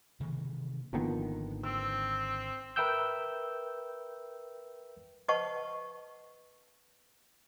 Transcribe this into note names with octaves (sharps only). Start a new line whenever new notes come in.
C3 D#3 E3 A#3
G#1 D3 D#3 F3 A#3 B3
C4 E6
A#4 B4 E5 G5 E6 G6
B4 C5 D#5 F#5 A5 C#6